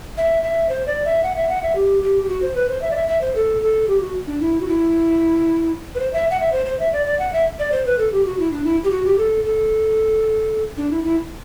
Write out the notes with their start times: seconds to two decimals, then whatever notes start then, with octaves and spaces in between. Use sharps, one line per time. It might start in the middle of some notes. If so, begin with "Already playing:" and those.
0.17 E5
0.43 E5
0.69 C5
0.87 D5
1.05 E5
1.23 F#5
1.36 E5
1.49 F#5
1.63 E5
1.75 G4
2.03 G4
2.23 G4
2.29 F#4
2.42 C5
2.55 B4
2.69 C5
2.82 E5
2.91 D5
2.95 E5
3.08 E5
3.21 C5
3.36 A4
3.62 A4
3.88 G4
4.01 F#4
4.27 D4
4.41 E4
4.60 F#4
4.68 E4
5.95 B4
6.00 C5
6.13 E5
6.31 F#5
6.40 E5
6.52 C5
6.66 C5
6.80 E5
6.93 D5
7.06 D5
7.19 F#5
7.33 E5
7.59 D5
7.72 C5
7.86 B4
7.99 A4
8.12 G4
8.25 F#4
8.39 E4
8.52 D4
8.65 E4
8.84 G4
8.91 F#4
9.05 G4
9.18 A4
9.44 A4
10.77 D4
10.91 E4
11.04 E4